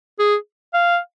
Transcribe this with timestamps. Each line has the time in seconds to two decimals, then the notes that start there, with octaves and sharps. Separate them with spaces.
0.19 G#4
0.74 F5